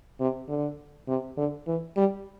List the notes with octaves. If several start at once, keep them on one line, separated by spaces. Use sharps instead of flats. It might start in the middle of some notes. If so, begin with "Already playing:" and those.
C3
D3
C3
D3
E3
G3